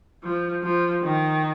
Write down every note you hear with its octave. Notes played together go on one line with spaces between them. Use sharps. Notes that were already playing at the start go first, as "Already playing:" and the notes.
F3
F3
D#3